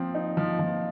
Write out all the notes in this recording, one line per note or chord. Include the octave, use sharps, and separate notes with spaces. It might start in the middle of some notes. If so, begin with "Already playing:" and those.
Already playing: F3 C4
D#4
F3
F3